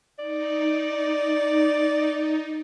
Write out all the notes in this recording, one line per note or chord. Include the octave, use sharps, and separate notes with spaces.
D#4 D5